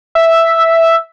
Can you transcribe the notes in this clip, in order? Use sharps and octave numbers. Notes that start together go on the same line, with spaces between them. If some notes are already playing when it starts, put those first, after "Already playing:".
E5